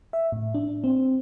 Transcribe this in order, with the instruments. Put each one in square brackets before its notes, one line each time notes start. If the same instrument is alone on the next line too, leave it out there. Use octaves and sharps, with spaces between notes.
[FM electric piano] E5
A2
D4
C4